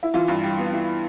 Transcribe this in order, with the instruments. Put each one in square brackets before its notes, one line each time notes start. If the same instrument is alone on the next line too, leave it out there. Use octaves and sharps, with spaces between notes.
[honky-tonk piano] E4
[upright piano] E3 [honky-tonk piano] F4
[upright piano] G2
G3
B3
E3